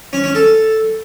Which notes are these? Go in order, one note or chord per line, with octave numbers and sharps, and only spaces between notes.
C#4
C#4
A4